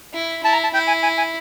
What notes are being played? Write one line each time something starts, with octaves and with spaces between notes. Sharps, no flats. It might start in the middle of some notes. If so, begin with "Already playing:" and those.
E4
E4 A5
A#5
A5
E4 G5
G#5
G#5
G#5